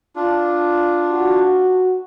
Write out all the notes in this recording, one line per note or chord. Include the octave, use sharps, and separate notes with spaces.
D4 F4
F#4